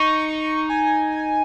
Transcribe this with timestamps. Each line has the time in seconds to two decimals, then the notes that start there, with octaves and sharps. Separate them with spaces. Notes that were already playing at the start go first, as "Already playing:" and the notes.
Already playing: D#4 C#6
0.69 G#5